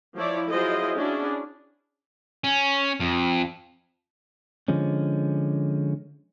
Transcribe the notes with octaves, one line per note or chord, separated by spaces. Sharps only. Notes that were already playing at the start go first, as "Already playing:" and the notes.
F3 E4 C#5 D5
F#3 E4 F4 G#4 C5 D#5
C#4 D4 E4 F#4 G#4
C#4
F2
D3 F3 G#3 C#4